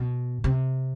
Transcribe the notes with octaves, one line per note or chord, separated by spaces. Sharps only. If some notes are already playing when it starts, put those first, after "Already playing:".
Already playing: B2
C3